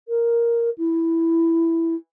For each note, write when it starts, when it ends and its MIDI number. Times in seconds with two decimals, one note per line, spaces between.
0.08 0.69 70
0.77 1.94 64